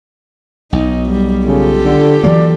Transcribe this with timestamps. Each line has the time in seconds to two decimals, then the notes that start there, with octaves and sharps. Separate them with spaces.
0.73 B1 D#4
1.09 G3
1.46 C#3 F4 G4 A4
1.84 D3
2.24 E3 F#3 A#3 D5